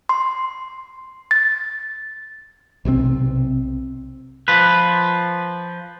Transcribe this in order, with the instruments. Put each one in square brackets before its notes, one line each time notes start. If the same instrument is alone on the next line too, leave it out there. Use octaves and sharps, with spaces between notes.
[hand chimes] C6
A6
[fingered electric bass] B1 C3 E3 C4
[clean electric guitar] F3 B4